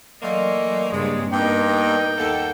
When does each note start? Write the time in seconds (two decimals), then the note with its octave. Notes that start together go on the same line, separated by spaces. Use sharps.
0.22 E3 F#3 A3 A#3 D5 D#5 C6
0.93 G2 C#3 G#3 A#3 C4
1.32 G2 A#3 B3 D#4 A#4 G5
2.18 D#2 A#3 A4 F5 F#5